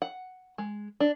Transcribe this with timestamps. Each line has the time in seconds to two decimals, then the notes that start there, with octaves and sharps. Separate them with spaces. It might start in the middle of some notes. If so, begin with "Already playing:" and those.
0.02 F#5
0.58 G#3
1.00 D4